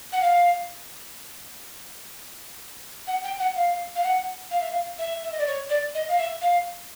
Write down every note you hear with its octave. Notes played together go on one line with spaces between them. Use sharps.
F#5
F5
F#5
G5
F#5
F5
F5
F#5
F5
E5
F5
E5
E5
D#5
D5
C#5
D5
D#5
F5
E5
F5